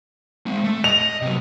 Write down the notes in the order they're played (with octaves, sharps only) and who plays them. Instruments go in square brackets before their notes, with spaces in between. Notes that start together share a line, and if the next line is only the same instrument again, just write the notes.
[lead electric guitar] G#3 C4
A3
[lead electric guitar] D#5 [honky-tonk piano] F7
[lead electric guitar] C3 F#3